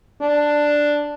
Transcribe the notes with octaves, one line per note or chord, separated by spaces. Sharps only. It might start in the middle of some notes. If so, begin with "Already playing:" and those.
D4